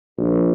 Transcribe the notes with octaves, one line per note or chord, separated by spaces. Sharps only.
A#1